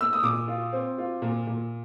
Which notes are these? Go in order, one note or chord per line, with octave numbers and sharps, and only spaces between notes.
E6
D#6
A#2 D6
F4
C4
F4
A#2
A#2